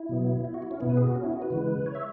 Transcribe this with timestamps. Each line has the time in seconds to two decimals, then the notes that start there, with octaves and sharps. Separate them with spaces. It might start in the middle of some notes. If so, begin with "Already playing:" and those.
Already playing: E4
0.09 B2 F#3 B3
0.45 E4
0.54 F#4
0.62 E4
0.71 C#4
0.80 B2 B3 E4
0.89 B4
0.97 G#4
1.07 F#4
1.15 C#4
1.24 E4
1.33 F#4
1.42 B4
1.50 C#3 E3 G#3
1.86 C#5
1.95 E5